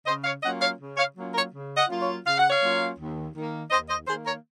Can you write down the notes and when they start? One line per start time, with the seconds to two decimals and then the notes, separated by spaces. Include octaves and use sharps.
0.07 C#3 C5 D#5
0.25 C#5 F5
0.43 F#3 A#3 C#4 F4 D#5 F#5
0.61 C#5 F5
0.80 C#3
0.97 C#5 F5
1.16 F#3 A#3 C#4 F4
1.34 A#4 C#5
1.53 C#3
1.77 D#5 F#5
1.89 F#3 A#3 C#4 F4
2.01 C#5 F5
2.26 C#3 F5
2.38 F#5
2.50 C#5 F5
2.61 F#3 A#3 C#4 F4
2.99 D#2
3.35 D#3 A#3
3.71 D#2 C5 D#5
3.89 C5 D#5
4.07 D#3 A#3 G#4 C5
4.26 A#4 C#5